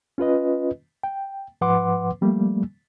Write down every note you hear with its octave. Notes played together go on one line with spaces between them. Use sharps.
C#4 F4 B4 D#5
G5
G#2 F3 B4 F#5 C6 D6
F3 G3 A3 A#3